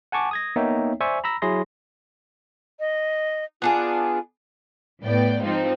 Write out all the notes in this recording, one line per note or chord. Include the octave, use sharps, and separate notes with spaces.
F#5 G#5 A5 C#6 D6
D#6 G#6 A#6
A#3 B3 D#4 C#5 E5 G5
C5 D5 E5 G#5 C#6 E6
A#5 B5 E6 A#6
F#3 E4 G#4 C6 A#6
D#5
B3 D4 F4 G#4
A2 B3 D5 G5
G#2 F3 C4 D#4